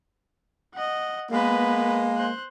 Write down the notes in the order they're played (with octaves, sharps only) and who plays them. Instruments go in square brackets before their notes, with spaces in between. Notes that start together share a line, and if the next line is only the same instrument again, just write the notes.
[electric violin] D#5 F#5
[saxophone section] G#3 A#3 [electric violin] B3 B4
[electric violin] C5 F#6